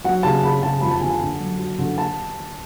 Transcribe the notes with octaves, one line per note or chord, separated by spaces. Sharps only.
F#3 F#5
C#3 A5
C#3 B5
C#3 A5
F2 B5
A5
D3 G#5
A5
D3
F#2
F#3
D3
A5